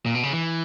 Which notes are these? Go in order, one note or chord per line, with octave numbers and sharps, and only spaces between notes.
A#2
B2
C#3
E3